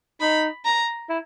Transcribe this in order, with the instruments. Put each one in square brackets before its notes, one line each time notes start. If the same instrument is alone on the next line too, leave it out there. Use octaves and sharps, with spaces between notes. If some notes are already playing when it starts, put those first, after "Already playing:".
[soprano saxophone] D#4 [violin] B5
[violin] A#5
[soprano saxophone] E4